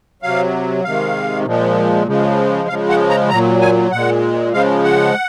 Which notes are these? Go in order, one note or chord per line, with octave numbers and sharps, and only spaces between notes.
C3 F#3 F5
C3 D#3 G#3 F5
A#2 F3 G#3
C#3 F3 G#3
C#3 F3 G#3 F5
F#5
A#5
A#2 F#3 A#5
G#5
A#2 G#3 F#5
C#3 F3 G#3 F5
F#5